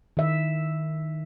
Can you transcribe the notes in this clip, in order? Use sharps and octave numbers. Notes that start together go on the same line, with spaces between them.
D#3 E5